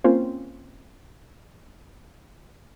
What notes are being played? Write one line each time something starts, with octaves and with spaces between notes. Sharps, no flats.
A#3 C4 C#4 F4 C5